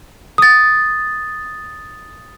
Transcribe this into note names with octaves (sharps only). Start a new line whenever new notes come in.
D#6 A6